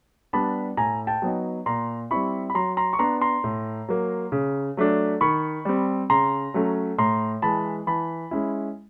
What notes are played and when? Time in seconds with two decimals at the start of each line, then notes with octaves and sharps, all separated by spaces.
0.33 G3 B3 D4 A5 B5
0.77 A2 G#5 A#5
1.07 G5 A5
1.22 F#3 B3 D#4
1.66 A#2 A#5 C6
2.11 G3 C4 E4 B5 C#6
2.50 B5
2.54 F#3 A#5 C6
2.77 A#5 C6
2.93 C#6
2.99 B3 D4 A#5 C6
3.21 A#5 C6
3.44 A2
3.88 F#3 A#3
4.32 C#3
4.77 F#3 A3 D4
5.21 D#3 B5 C#6
5.65 G3 C4
6.10 C#3 A#5 C6
6.54 F#3 A3 C#4
6.98 A2 A#5 C6
7.42 E3 G#3 A5 B5
7.87 E3 A5 B5
8.31 G#3 C#4 E4